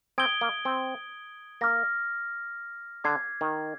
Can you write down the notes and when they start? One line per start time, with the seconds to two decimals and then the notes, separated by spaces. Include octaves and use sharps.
0.18 C4 D#6 G#6 D7 G7
0.41 A#3
0.65 C4
1.61 A#3 D6 F6 A#6
3.04 D3 D6 G#6 C7
3.41 D#3